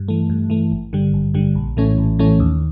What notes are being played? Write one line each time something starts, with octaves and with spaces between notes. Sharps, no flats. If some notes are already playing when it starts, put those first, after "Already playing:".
Already playing: G2
E3 A3
G2
E3 A3
G#1
G2 D3 G3
G#1
G2 D3 G3
A#1
A2 E3 A3 C#4
A#1
A2 E3 A3 C#4
D#2